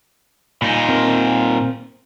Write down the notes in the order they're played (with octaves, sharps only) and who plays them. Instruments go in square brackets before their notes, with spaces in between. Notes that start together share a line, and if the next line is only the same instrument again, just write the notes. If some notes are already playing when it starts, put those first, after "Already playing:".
[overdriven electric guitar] A#2 D#4 [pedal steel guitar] G#5 B5
[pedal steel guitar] C4 A#4 C6